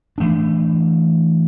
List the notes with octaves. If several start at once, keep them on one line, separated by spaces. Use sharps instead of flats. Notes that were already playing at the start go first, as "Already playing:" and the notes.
E3 A3 D4